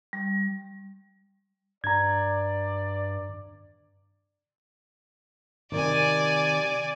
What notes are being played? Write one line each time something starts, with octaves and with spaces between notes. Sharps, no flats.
G3
G2 D5 A#5 G#6
C3 D#3 D5 G#5